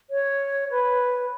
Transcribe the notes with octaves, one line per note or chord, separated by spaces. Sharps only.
C#5
B4